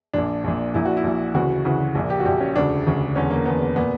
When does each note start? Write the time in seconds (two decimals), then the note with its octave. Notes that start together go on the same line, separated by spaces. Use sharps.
0.13 A#1 A#2 D4
0.44 A#1 A#2
0.74 A#1 A#2 E4
0.85 F#4
0.97 E4
1.04 A#1 A#2
1.34 D2 C#3 E3 F#4
1.65 D2 C#3 E3
1.95 A#1 A#2
2.10 G4
2.20 F#4
2.25 A#1 A#2 G4
2.40 C#4
2.55 E1 D2 C#3 D4
2.85 E1 D2 C#3
3.15 E1 E2 D3 C#4
3.31 A#3
3.45 E1 E2 D3 B3
3.76 A#2 B3